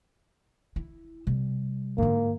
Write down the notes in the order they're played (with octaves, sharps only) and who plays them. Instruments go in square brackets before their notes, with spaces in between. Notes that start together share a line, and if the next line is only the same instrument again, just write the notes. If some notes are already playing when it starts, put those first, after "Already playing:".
[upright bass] E4
C3 G3
[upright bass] G#2 D3 [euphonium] A#3